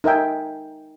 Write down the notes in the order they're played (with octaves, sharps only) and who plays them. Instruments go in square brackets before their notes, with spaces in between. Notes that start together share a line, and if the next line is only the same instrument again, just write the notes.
[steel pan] D#4 A#4 E5 G5 G#5